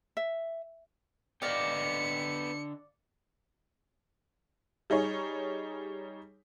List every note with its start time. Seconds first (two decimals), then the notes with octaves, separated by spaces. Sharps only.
0.17 E5
1.42 D3 B3 G4 D5 D#5 F5 G5 C#7
4.90 G3 D#4 G#4 C#5